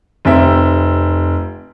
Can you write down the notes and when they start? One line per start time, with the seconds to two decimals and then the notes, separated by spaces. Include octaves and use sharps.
0.25 F1 C4 E5